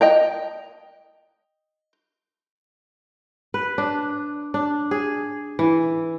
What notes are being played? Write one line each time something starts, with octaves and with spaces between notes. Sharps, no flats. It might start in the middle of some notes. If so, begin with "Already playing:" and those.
D#5 G5 A#5
B4
D4
D4
G#4
E3